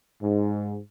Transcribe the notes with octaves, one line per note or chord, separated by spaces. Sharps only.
G#2